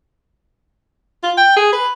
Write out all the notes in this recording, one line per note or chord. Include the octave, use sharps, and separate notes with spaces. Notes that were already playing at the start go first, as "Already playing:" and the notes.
F4
G5
G#4
B4